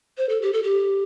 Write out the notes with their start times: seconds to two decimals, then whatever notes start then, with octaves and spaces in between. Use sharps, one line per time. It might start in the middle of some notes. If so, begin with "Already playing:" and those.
0.18 C5
0.29 A4
0.42 G4
0.53 A4
0.63 G4